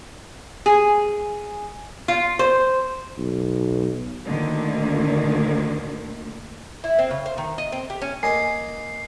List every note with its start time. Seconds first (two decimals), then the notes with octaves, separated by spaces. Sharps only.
0.66 G#4
2.08 F4
2.39 C5
3.18 B1
4.27 D2 A#2 D3 D#3
6.84 E4
6.99 C4
7.11 C#3
7.26 C5
7.38 D#3
7.58 D#5
7.72 C4
7.90 G4
8.01 C#4
8.23 A#3 D#5 G#5 C6 C7